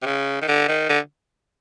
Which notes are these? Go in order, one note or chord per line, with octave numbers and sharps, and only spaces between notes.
C3
C#3
D#3
D3
D#3
D3